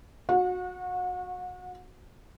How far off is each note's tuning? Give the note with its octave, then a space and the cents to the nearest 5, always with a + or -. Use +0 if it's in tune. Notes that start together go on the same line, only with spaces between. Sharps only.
F#4 -20 F#5 -40